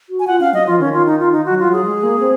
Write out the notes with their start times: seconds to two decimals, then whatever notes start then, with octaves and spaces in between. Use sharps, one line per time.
0.10 F#4
0.19 G#5
0.27 F4 F#5
0.40 C#4 F5
0.53 F#3 D#5
0.67 F3 F4
0.80 D#3 C#4
0.93 F4
1.06 D#4
1.19 F4
1.32 D#4
1.45 F#4
1.50 F#3
1.59 F4
1.68 F#3 G#4
1.85 G#3
2.03 A#3
2.20 C4